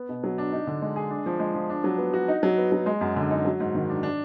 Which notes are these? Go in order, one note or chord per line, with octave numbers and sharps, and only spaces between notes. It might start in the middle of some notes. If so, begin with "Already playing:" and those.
Already playing: B3
B2
F#3
D4
D#4
D3
G#3
G#4
D4
F3
G#3
F3
D4
F#3
B3
F#4
D#4
F#3
B3
F#3
G#3
F#2
D3
D#4
F#3
G#2
D#3
D4
D4